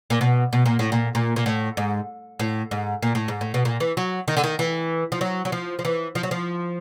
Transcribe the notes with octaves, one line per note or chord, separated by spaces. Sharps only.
A#2
B2
B2
A#2
A2
A#2
A#2
A#2
A2
G#2
A2
G#2
A#2
A2
G#2
A2
B2
A#2
E3
F#3
D#3
D3
D#3
E3
F3
F#3
F#3
F3
F3
E3
F3
F#3
F3